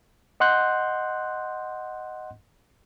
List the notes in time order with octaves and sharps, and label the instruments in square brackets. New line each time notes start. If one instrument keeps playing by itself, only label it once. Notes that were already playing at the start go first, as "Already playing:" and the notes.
[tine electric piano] D#5 F#5 C6 F#6 G6